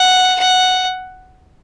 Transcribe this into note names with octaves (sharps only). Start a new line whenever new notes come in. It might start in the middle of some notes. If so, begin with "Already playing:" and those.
Already playing: F#5
F#5